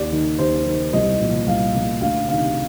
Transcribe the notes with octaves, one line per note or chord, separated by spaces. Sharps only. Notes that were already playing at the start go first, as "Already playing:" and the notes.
Already playing: D#2 D5
D#3
D#2 C5
D#3
C2 D#5
A#2 F3
C2 F5
A#2 F3
D2 F5
C3 D#3 F5